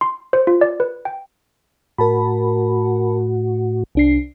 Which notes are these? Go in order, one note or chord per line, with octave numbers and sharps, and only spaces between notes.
C6
C5
F4
D5
B4
G5
A2 F#4 A#4 A5 B5
C2 D4 C7